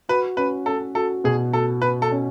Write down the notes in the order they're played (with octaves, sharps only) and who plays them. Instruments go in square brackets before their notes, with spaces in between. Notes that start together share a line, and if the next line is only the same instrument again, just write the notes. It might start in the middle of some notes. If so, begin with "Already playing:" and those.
[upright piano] F#4 [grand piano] B4
[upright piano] C#4 [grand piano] B4
[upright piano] C#4 [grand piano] A4
[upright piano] F#4 [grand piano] A4
[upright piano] B2 [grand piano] G#4
[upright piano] F#4 [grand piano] A4
[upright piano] F#4 [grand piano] B4
[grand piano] A4
[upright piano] C#4